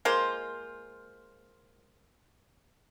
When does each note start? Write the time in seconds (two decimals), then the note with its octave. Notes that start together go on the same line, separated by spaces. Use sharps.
0.05 G#3 A#3 F4 C5